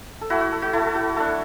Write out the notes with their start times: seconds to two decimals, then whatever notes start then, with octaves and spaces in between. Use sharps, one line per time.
0.21 A4
0.30 A3 E4 F#4
0.41 F#4
0.52 A4
0.62 F#4
0.73 A3 E4 A4
0.86 A4
0.95 F#4
1.16 A3 D4 A4